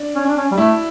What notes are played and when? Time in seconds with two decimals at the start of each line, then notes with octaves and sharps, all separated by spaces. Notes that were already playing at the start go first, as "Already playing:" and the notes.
Already playing: D4
0.16 C#4
0.27 D4
0.37 C#4
0.52 G3
0.57 A3 E4